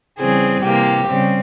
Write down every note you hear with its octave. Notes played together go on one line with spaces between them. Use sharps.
C#3 E3 G3 C4 G#4
C3 E3 A#3 G4
C#3 G3 C4